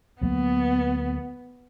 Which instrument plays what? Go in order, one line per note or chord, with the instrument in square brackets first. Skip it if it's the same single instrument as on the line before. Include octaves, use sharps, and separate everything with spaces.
[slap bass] D2 F#3 A#3 [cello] B3